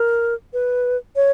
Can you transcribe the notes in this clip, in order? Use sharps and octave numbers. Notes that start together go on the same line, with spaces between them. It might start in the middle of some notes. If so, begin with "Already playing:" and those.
Already playing: A#4
B4
C#5